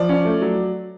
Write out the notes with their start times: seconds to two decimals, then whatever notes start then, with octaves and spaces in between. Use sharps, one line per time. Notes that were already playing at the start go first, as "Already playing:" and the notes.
Already playing: F3 D5
0.09 C#4
0.25 A3
0.42 F#3